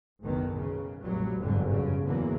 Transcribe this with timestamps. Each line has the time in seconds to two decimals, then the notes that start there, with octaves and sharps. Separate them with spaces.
0.22 F#1 B1 B2 D#3
0.57 C#3
1.01 F1 A#1 F#3 G3
1.39 G1 F2 G#2 B2 D3 F#3
1.68 F#2 C#3
2.04 E2 G#2 D3 E3 F#3 A#3